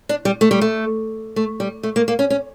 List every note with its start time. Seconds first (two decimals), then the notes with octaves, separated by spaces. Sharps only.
0.09 D4
0.25 G3
0.41 A3
0.51 G3
0.61 A3
1.36 A3
1.60 G3
1.83 A3
1.96 A#3
2.08 A#3
2.19 C#4
2.30 C#4